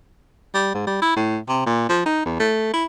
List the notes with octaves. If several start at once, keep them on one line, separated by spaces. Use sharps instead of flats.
G3
G#2
G3
E4
A2
C3
A#2
F3
D#4
E2
A3
E4